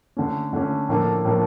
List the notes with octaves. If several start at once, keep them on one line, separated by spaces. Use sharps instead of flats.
D3 A3 C#4
D3 A3 C#4
A2 F3 A#3 D4 A4
A2 F3 A#3 D4 A4